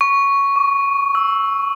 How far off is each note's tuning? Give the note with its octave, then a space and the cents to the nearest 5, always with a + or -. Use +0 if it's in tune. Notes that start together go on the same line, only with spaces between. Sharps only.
C#6 +5
C#6 +45
E6 -5